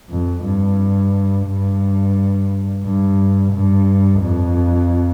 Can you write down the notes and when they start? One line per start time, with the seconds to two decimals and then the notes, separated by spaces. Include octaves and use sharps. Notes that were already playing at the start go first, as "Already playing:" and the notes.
0.10 F2
0.44 G2
1.46 G2
2.84 G2
3.52 G2
4.20 F2